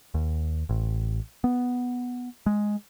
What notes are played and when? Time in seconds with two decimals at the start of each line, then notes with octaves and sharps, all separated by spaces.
0.14 D#2
0.69 A1
1.44 B3
2.46 G#3